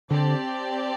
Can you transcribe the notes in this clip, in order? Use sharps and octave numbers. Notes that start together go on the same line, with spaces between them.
D3 C4 G4 D5 A5